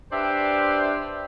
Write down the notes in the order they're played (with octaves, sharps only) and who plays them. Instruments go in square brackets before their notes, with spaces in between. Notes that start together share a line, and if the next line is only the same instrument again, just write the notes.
[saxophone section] D4 G4 B4 C5 D5 E5